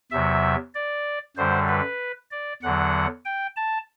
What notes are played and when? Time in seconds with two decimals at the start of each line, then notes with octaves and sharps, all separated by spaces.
0.11 E2 C3 F#3 E5
0.75 D5
1.37 F#2 D3 G3 C5
1.68 B4
2.31 D5
2.62 E2 D3 F#3 F#5
3.25 G5
3.56 A5